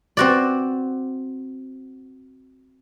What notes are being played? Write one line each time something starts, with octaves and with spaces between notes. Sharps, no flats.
C4 F#4 D5